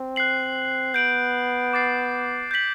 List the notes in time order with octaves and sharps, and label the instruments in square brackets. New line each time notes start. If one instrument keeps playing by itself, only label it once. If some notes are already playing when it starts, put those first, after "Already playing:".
Already playing: [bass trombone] C4
[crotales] F#6 C7 F#7
[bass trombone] B3 [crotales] G6 D7 F#7
[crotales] D6 A6 C7
G6 B6 F#7